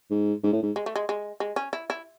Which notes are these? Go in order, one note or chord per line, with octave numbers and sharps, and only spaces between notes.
G#2
G#2
A2
G#2
G#3
A3
G#3
G#3
G#3
C#4
E4
E4